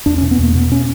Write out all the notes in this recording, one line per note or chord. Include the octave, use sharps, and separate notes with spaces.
E2 D4
C#4
B2
B3
E2 A#3
B2 B3
C#4